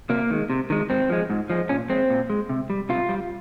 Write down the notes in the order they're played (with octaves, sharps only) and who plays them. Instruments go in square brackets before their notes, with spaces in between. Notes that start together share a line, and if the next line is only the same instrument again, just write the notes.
[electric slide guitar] C3 A#3
D#3 G#3
C3
D#3 G#3
G#2 C4
F3 G#3
G#2
F3 G#3
A#2 C#4
G#3 C4
A#2
G#3
C3
G3
C3 F4
G3